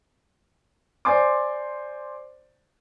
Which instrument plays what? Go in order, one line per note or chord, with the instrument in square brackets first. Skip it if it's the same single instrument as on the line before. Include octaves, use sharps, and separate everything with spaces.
[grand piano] C5 D5 G#5 C6 D6